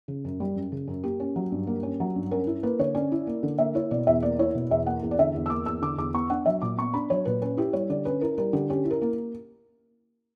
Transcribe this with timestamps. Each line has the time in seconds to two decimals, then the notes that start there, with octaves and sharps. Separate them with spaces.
0.08 C#3
0.25 F#2
0.40 G3
0.55 F#2
0.72 C#3
0.87 F#2
1.03 A#3 G4
1.20 C#4
1.36 F#3
1.52 G2
1.67 A#3
1.83 C#4
2.00 F#3
2.16 G2
2.31 C#4 A#4
2.47 E4
2.63 A#3 B4
2.79 D3 C#5
2.95 C#4 D5
3.12 E4
3.27 A#3
3.43 D3
3.58 A#3 E5
3.75 E4 C#5
3.91 B2 D5
4.07 E2 E5
4.22 A#3 D5
4.39 E4 C#5
4.55 B2
4.71 E2 E5
4.86 A#3 F#5
5.03 E2
5.11 D5
5.18 D3 E5
5.35 E2
5.46 E6
5.50 A#3 D6
5.66 E2 E6
5.82 D3 D6
5.98 E2 D6
6.14 B3 C#6
6.30 D4 F#5
6.46 F#3 E5
6.62 A#2 D6
6.78 B3 C#6
6.94 D4 B5
7.10 F#3 C#5
7.25 A#2 B4
7.42 C#4 B4
7.57 E4 G4
7.73 G3 C#5
7.90 D3 D5
8.05 C#4 B4
8.21 E4 A#4
8.38 G3 A#4
8.53 D3 G4
8.70 C#4 G4
8.85 E4
8.91 A#4
9.02 A#3